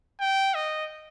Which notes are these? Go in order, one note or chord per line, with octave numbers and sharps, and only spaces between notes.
G5
D#5